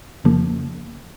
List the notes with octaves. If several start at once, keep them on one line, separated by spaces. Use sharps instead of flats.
F2 C#3 F3 A#3